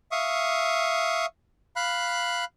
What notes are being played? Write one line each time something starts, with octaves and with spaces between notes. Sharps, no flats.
E5 F5 C#6 D#6
F5 B5 F#6